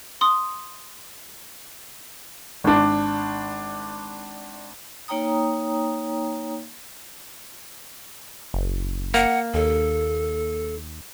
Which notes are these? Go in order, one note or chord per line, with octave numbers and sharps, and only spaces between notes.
C6 D#6
G#1 D4
A#3 D#4 C#5 G5 A#5 D#6
F#1
A#3 F#5
D#2 A4